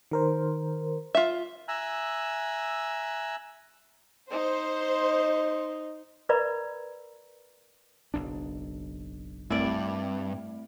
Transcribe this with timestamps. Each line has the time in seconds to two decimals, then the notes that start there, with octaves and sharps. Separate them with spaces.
0.11 D#3 A#4 C5
1.15 F4 E5
1.68 E5 G#5 A#5 E6 F#6
4.31 D#4 C5
6.29 A#4 B4 D5 E5 A#5 B5
8.14 F#1 B1 D4
9.50 G2 A3 C4 E4 D5